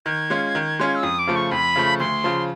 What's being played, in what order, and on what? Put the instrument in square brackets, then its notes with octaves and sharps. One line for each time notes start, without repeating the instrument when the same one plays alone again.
[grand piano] D#3 [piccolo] G#6
[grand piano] G#3 C#4 F4
D#3
G#3 C#4 F4
[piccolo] E6
[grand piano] F2 [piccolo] D#6
[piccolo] D6
[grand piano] C#3 F3 A3
[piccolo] C#6
[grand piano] F2 [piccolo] B5
[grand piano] C#3 F3 A3
[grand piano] D2 [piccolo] C6
[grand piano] C#3 F3